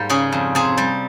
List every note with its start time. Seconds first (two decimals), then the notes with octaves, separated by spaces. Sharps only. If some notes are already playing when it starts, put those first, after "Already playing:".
Already playing: G#2 G3 A#3
0.10 C#3 G#4
0.32 F2
0.55 C3 G#4
0.77 G3